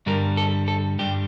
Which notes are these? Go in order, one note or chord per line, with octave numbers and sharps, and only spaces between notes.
G2 D3 G3 A#4
A4
A4
G2 D3 G3 G4